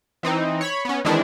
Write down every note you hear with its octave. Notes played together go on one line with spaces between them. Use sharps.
E3 C4 D#4
C#5 B5
B3 C#4
D#3 E3 G#3 C4 D4 E4